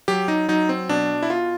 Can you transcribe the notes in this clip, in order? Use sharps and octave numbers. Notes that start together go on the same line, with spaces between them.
F#3 G4
D#4
F#3 D#4
C4
B2 D4
E4
B2 F4